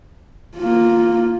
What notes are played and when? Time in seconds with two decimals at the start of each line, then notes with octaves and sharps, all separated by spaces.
0.58 A#3 F4